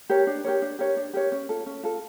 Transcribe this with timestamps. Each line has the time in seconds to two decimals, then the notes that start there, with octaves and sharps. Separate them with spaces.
0.10 G4 A#4 C#5
0.27 D4
0.44 G4 A#4 C#5
0.62 D4
0.79 G4 A#4 C#5
0.97 D4
1.14 G4 A#4 C#5
1.32 C#4
1.49 F4 A4
1.66 C#4
1.83 F4 A4